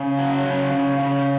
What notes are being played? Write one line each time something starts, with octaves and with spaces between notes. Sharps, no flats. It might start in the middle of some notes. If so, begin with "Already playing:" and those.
Already playing: C#3
F#3
C#3
C#3
C#3